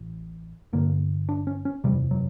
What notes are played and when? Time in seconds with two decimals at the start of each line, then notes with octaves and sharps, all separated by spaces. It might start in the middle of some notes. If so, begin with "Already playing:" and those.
Already playing: A1 A2
0.73 G1 G2 D3 A#3
1.29 D4
1.47 C#4
1.65 C#4
1.84 F#1 E2 C3 G3
2.11 F#3